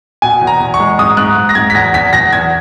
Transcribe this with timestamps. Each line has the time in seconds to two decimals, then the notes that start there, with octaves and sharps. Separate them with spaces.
0.22 B2 G#5
0.41 E2
0.47 A#5
0.60 E2
0.74 C#6
0.80 G#3
0.99 G#2 D#6
1.17 G#2 F#6
1.36 G#2
1.49 A#6
1.55 G#2 G#6
1.70 B6
1.75 E2 A#6
1.94 E2 B6
2.13 E2 A#6
2.33 E2 G#6